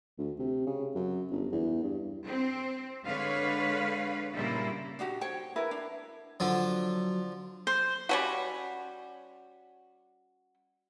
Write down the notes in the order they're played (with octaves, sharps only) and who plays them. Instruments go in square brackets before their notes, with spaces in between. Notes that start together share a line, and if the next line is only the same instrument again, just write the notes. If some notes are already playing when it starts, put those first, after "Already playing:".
[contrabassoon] D2
C3
C#3
F#2
G1
E2
G2
[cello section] C4
D3 G#3 B4 C#5 F5
A#2 C#3 G3 A#3 E4
[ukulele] D4 D#4 F#4 G4
C5 C#5 G5
E4 A#4 B4
D4
[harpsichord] D3 F3 [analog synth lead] F#3
[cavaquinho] C5
[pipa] G3 C#4 F#4